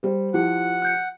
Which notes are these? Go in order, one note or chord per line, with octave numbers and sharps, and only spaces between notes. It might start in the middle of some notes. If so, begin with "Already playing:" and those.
G3 C5
F3 E4 G4 F#5
F#6 G6 C#7